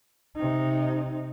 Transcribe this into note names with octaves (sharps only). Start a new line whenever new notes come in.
C3 D#4